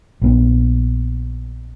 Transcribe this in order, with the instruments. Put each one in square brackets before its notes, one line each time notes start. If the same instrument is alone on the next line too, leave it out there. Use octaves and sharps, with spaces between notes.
[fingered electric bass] A#1 B3